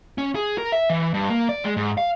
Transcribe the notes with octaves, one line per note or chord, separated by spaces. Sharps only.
C#4
G#4
A#4
E5
E3
G2
A#3
D5
G#3
G#2
F5